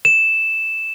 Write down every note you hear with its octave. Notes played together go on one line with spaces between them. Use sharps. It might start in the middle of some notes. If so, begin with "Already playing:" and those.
E7